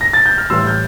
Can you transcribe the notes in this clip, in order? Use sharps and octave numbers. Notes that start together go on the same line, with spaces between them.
A#6
A6
G6
F6
A2 E3 G3 C6 E6
G6